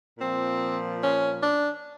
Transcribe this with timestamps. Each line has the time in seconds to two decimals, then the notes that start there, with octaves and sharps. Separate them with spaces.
0.19 A#2 F3 C4
1.01 C#4
1.40 D4